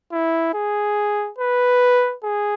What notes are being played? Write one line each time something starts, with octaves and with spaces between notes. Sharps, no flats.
E4
G#4
B4
G#4